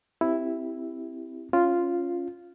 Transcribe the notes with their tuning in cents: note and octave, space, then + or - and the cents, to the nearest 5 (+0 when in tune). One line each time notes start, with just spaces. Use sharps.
C4 +0 E4 +0 G4 +0
C#4 +0 F4 -5